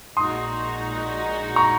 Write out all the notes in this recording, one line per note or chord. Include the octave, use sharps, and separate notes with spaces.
A#1 A#2 G#3 D#4 F#4 C6 D#6
A#5 C#6